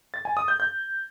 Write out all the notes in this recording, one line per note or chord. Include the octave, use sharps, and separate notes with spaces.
A6
G#5
D#6
G6
G6